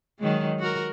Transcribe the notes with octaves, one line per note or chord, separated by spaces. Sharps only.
D#3 F#3 G#3
F#4 A#4